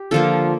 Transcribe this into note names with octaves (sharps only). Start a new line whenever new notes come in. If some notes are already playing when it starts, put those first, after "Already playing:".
Already playing: G4
D3 F3 A#3 F4 A4